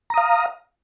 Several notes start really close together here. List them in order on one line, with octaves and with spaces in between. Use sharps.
A#5 D#6 F5